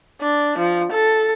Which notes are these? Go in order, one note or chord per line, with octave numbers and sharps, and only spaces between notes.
D4
F3
A4